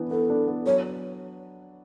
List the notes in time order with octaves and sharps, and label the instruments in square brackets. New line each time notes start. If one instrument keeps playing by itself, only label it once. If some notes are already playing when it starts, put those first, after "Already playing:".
Already playing: [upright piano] E3 B3 D4
[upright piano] B3 [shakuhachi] A4
[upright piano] D4
B3
[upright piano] F#3 [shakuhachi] C#5